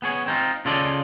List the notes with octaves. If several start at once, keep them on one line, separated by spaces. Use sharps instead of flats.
B3 G#4 C#5
C4 D#4 F4
C#3 F4 A4 D5 D#5